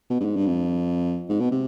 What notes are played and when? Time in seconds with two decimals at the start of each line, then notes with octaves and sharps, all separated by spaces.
0.10 B2
0.20 G2
0.25 G#2
0.36 G2
0.46 F2
1.29 G#2
1.40 B2
1.51 C3